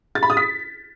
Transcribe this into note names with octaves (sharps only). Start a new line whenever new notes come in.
A6
B5
D#6
B6